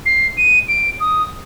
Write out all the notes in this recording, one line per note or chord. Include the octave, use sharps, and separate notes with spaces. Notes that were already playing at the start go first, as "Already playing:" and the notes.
C7
D#7
D7
D#6